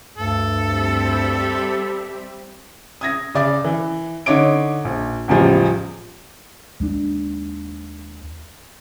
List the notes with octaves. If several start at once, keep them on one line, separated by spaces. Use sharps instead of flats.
D2 G2 A4
G3 C4 E5
D#6 G#6 A#6
C#3 D5 D6
E3
D3 D#4 C#5 D6 D7
A#1
A1 E2 C#3 F3 G3
D#2 G#3 A3 D4